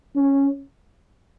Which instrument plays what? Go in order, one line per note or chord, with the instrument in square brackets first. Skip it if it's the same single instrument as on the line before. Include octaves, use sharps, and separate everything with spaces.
[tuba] C#4